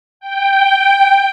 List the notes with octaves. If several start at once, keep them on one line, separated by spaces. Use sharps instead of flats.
G5